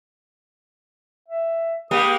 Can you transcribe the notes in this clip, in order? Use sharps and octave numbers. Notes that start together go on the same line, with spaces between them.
E5
G#3 A#3 G4 D#6